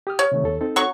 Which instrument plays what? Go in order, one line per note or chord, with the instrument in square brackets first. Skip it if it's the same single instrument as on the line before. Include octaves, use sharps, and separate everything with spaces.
[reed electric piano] G4 D#6 F6
[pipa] C#5
[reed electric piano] C3 D#3 A3
D#2 A4
C4 D#4 A4
[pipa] F#3 C#6